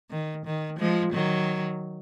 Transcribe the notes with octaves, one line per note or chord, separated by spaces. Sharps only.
D#3
D#3
F3 G#3
D#3 F#3